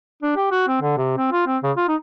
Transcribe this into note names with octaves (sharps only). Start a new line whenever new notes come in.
D4
G4
F#4
C4
D3
C3
C4
F4
C4
C#3
F4
D#4